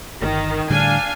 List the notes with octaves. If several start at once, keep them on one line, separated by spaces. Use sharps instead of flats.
G1 D#3
A2 D3 G3 D4 F5 G#5